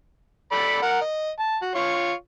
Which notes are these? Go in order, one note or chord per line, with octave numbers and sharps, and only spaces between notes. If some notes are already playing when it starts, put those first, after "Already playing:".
A4 D5 B5
A#4 F#5
D#5
A5
F#4
F4 C#5 C#6